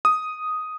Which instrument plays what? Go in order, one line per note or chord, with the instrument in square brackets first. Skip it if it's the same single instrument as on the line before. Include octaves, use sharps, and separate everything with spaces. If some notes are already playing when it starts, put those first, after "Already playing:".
[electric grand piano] D#6